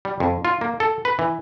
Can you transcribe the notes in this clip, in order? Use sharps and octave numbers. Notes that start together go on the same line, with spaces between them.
G3
F2
F4
A#3
A4
B4
E3